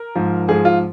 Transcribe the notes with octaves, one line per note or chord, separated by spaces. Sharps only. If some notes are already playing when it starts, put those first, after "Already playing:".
Already playing: A#4
G#2 F3
G#2 F3 G#4
F4